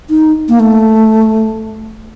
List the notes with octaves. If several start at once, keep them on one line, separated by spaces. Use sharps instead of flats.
D#4
A#3
A3